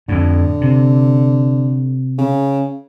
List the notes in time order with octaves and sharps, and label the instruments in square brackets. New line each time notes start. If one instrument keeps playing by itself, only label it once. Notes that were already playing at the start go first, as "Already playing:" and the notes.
[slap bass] F2 A2 [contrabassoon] D3
[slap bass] C3
[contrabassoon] C#3